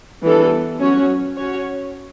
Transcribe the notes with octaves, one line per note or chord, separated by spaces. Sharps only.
E3 G3 B3 D4 A4
F#3 C#4 F#4 C#5
C#4 F#4 C#5